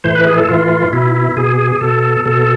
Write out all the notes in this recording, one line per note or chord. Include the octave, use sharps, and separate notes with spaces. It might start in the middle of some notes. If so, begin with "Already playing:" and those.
A2 E3 C5
B4
G#4
A4
A2 E3 F4
B2 E4
E4
B2 G#4
B2 A4
B2 A4